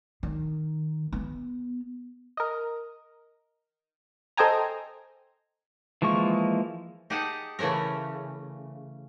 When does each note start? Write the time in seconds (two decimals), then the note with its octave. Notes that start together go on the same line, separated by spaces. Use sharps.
0.23 D#3
1.12 B3
2.37 A#4 D#5
4.37 A4 C5 D#5 G5 G#5 A#5
6.02 E3 F3 G#3 A#3 C#6
7.10 D#4 G4 G#4 F#5 G#5 A5
7.59 C#3 E3 A3 C#4 A#4